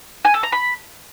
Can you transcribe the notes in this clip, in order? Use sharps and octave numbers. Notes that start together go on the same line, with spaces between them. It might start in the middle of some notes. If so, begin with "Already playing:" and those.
G#5
A4
A#5
B5